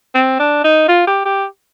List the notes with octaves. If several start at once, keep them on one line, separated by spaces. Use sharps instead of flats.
C4
D4
D#4
F4
G4
G4